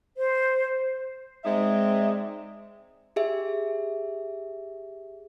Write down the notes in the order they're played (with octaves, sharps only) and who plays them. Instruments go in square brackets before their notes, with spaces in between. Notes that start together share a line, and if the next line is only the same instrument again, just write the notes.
[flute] C5
[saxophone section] G#3 C4 D#4 D5 E5
[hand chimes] G4 G#4 E5